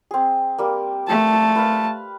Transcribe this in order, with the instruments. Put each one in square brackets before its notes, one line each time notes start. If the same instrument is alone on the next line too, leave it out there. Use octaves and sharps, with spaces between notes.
[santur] C4 G#4
G3 A#3
[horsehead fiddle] A3 A5
[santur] B4 F5